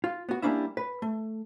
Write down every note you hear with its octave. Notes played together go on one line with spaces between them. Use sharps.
F4
B3 F#4
G3 A#3 C#4 D4 E4 E5
B4
A3